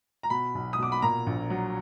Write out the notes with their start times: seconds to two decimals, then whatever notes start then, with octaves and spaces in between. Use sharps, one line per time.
0.23 A#5
0.30 B2 B5
0.55 B1
0.73 D#6
0.79 B2 D6
0.92 B5
1.02 A#2 A#5
1.27 A#1
1.50 F#3